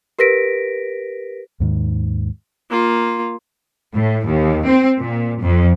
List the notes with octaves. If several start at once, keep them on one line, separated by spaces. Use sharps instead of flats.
G4 A#4 B4 A#6 B6 D7
D#2 G#2 D#3
A#3 F4
A2
D#2
C4
A#2
F2